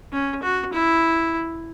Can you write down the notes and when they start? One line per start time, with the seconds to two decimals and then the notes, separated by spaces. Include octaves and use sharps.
0.13 C#4
0.43 F#4
0.73 E4